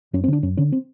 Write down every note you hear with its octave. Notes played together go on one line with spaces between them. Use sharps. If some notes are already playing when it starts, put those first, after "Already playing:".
F#2 C#4
C4
D3 D4
F#2 C#4
D3 C#4
C4